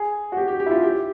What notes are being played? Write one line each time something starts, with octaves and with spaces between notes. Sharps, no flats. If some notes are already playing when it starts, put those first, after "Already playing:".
Already playing: G#4
F#4
G4
G4
G4
E4
F4
G4